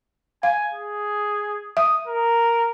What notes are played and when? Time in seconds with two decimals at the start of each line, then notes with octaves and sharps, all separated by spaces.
0.43 F5 G#5
0.73 G#4
1.77 E5 D#6
2.07 A#4